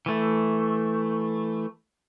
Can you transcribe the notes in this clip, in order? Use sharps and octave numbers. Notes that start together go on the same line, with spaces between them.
E3 A3